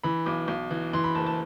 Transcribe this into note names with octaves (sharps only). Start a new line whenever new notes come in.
E3 B5
B1 D6
B1
E3
E3 C6
B5
F#1 A5
A5